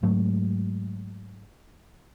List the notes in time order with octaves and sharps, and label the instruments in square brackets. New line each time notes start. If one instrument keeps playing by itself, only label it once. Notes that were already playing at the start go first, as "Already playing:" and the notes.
[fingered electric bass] G#2 F#3 A3